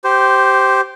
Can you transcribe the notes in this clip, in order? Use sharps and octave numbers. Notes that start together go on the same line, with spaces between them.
G4 C5